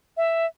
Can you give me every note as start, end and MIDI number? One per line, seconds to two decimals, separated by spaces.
0.17 0.46 76